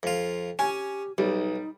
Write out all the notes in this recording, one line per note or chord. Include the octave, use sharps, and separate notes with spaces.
F2 F4
C#4 G4 G#5
B1 G3 D#4